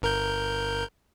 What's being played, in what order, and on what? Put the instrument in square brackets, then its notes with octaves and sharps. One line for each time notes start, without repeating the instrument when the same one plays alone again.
[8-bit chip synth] G1 A#4 G6